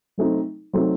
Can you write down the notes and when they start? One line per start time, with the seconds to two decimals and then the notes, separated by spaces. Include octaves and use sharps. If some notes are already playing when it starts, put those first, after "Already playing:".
0.18 F#3 A3 C4 D#4
0.73 F#3 A3 C4 D#4